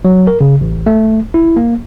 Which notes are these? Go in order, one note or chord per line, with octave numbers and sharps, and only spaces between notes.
F#3
A#4
C#3
A1
A3
E4
A#3